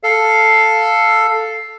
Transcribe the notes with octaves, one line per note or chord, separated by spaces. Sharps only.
A4 F5